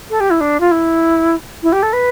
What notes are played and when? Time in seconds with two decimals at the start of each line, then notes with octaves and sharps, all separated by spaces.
0.10 A4
0.20 G4
0.31 E4
0.41 D4
0.60 F4
0.71 E4
1.63 E4
1.73 G4
1.83 A4
1.93 B4